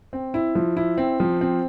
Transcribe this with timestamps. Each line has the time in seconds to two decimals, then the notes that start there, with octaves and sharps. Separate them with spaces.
0.13 C4
0.34 E4
0.55 F3
0.77 E4
0.98 C4
1.20 F3
1.41 C4